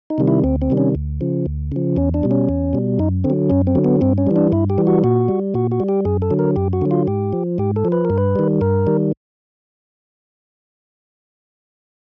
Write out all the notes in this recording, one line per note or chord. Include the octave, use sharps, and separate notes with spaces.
D#4
C3 D#3 G3
E4
D2 C4
C4
C3 D#3 G3
C#4
D2
C#3 F3
D2
C#3 F3
E2 C#4
D4
B2 G3
C#4
E2
B2 G3
F#2 D#4
D3 C4
F#3
F#2 C#4
C4
D3 F#3
B3
G2 C4
C#4
E3 G3
D4
G2 E4
G4
E3 G3
F#4
A#2 F#4
G3
A#2 F#4
F#4
G3
G4
F#2 G#4
A4
D3 F#3
A#4
F#2 G4
F#4
D3 F#3
F4
G#2 G4
F3
G#2 G4
A4
F3
B4
A#4
G2
B4
D#3 G3
G2 A#4
D#3 G3